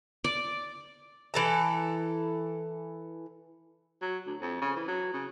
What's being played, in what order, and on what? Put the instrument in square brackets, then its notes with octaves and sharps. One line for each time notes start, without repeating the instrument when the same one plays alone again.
[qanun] D5
[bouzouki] E3 A4 A#5
[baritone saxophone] F#3
D2
F2
C#3
E3
F#3
C#3